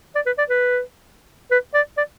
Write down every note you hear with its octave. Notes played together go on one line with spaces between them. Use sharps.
D5
B4
D5
B4
B4
D5
D5